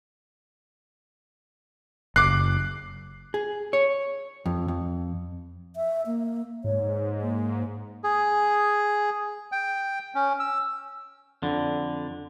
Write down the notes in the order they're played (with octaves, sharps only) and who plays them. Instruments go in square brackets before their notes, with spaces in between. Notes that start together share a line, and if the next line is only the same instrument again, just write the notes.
[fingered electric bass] F#1 [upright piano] D6 C7 [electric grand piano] F#6
[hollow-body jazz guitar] G#4
C#5
F2
F2
[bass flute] E5
A#3
[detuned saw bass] G#2 [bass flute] C#5
[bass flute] A#3
[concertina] G#4
G5
C#4
E6
[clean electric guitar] F2 D3